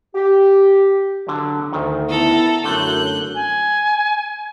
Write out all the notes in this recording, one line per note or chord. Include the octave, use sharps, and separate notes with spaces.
G4
D3 F#3
D2 D#3
B3 E4 A4 A#5
F#2 D3 A3 E4 F#6 G6
G#5